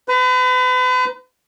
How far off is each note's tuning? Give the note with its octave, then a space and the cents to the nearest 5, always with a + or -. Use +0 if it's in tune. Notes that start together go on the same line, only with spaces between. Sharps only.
B4 +40 A#5 +30